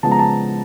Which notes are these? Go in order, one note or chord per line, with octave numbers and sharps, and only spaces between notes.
C#3 F3 G#3 B3 A5
A#5
A5